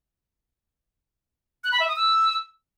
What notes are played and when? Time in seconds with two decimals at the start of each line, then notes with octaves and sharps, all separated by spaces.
1.64 F#6
1.72 B5
1.80 E5
1.88 D#6
1.96 E6